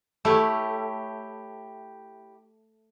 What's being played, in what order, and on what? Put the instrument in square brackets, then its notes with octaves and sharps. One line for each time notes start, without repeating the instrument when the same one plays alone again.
[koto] A3 [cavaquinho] E4 G4 C#5